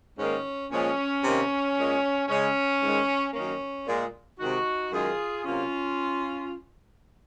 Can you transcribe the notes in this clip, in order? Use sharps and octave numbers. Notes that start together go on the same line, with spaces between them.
G#2 D#3 A#3 C#4
A#2 F3 G#3 C#4
C3 D#3 A#3
A#2 G#3
C#3 G#3 C#4
G#2 D#3 G#3
F#2 D#3 A#3 C#4
A#2 G#3
C3 D#3 G#3 D#4 F#4
F#2 D#3 G#3 F4 G#4
C3 F#3 A#3 C#4 F4